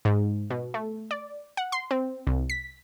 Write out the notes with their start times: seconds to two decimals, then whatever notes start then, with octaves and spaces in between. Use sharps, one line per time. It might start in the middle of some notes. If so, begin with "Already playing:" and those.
0.05 G#2
0.50 B2
0.74 A3
1.11 D5
1.57 F#5
1.72 C6
1.91 C4
2.27 C2
2.50 B6